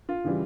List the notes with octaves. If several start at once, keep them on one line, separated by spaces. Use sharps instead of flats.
F4
C#3 E3 G3